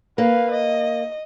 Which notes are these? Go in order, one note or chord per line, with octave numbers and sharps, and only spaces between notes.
A#3 B4 F5
D#5